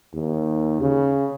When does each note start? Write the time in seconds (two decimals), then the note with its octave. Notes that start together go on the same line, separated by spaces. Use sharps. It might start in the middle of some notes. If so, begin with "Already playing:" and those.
0.13 D#2
0.80 C#3